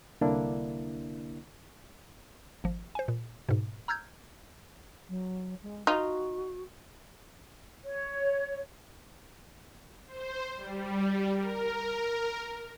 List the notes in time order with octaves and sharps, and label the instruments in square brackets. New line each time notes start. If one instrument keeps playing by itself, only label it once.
[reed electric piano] C2 D3 A#3 D4 E4
[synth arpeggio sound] G#1 F3
C5 G#5
A#2
G#2 B2
A#5 E6 F6 G6 G#6
[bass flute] F#3
G#3
[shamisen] D#4 F4 [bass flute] F#4
[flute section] C#5
[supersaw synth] C5
G3
A#4